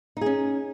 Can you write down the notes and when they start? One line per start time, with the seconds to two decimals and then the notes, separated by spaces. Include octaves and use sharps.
0.17 D#4
0.21 G#4
0.26 C#4